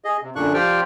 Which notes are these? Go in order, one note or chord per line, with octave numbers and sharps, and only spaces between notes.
G#4 D#5
C3
F#2 A#2 D3 D4 C#6 F#6
F3 G4 C5 D5 G5 F6